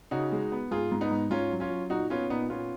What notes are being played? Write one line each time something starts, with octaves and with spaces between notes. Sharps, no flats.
C#3 D#4 F#4
G#3
B3
G#2 F4 G#4
G#2
B3 D#4
G#2
G#2 C#4 F4
F#3
C#4 F4
F#3
A#2 D#4 F#4
B3 C#4 F4
A#2 B3 D#4
B3 C#4 F4